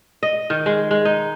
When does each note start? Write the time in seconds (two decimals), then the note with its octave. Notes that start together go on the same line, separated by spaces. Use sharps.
0.23 D#5
0.50 D#3
0.66 G#3
0.91 G#3
1.05 D#4